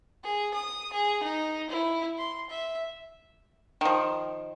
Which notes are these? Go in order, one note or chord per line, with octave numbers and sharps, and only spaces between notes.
G#4
D#6
G#4
D#4
E4
C6
E5
D#3 F3